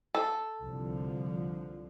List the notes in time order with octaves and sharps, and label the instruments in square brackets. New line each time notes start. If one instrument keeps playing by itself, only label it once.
[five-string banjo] A4
[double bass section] C2 D3 F3